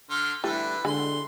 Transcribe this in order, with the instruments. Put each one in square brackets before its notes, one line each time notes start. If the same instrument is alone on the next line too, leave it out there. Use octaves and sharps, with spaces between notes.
[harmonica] D3 C6 F6
[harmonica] D3 B4 [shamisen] E3 G3 A3
[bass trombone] D3 [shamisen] G#3 [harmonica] C6